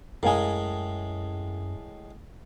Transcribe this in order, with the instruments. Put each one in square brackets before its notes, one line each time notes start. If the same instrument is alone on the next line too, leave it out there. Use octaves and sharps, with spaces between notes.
[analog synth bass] F#2 [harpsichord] A2 G#3 [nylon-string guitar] A#4 F5 G#5